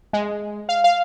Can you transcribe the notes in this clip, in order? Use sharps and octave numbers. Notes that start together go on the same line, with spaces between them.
G#3
F5
F5